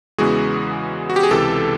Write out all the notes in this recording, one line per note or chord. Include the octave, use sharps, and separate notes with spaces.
E2 C#3 E3 G#3 B3 F#4 G#4
F#4
G4
G#4
C#2 C3 E3 G4 A4